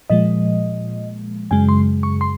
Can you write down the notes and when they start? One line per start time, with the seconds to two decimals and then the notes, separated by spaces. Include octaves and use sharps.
0.10 A#2 F3 G#3 D#5
1.51 F#2 C#3 G#3 G#5
1.69 C6
2.03 C#6
2.21 C6